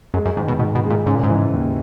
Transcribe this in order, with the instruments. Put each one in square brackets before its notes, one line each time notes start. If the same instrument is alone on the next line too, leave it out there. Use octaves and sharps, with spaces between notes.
[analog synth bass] F#2 [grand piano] G#3
[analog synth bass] F#2
[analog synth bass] G#2 [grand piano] D#3
[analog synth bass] B2
[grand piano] G#2 [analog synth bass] B2
[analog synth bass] B2
[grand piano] G#3
[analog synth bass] A#2
[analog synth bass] G#2 [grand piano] C#3
[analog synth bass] A#2
G#2
[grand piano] E3
D#2